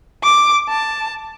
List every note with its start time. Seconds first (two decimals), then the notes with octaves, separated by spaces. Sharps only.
0.23 D6
0.69 A5